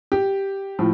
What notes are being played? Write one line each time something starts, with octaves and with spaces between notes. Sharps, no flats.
G4
A2 F3